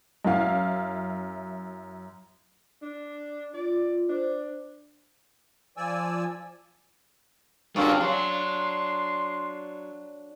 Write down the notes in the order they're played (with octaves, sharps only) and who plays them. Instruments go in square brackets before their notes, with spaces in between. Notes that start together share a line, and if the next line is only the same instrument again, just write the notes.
[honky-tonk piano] F#2 E4 F5
[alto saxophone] D4
[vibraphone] F4 [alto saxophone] D5
[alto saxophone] D4 [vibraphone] C5
[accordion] F3 D5 G#5 E6
[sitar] G2 A#3 F#4 [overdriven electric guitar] C#4 G#4 [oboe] F4
[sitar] F#3 [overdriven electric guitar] D4 [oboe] C6